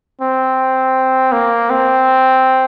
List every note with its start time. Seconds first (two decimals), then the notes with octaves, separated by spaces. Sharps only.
0.21 C4
1.32 A#3
1.70 C4